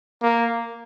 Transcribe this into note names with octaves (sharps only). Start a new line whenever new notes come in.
A#3